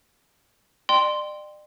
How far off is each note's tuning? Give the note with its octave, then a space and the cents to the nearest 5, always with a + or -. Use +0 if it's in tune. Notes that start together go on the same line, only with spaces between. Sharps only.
D5 +40 G5 +0 C6 +0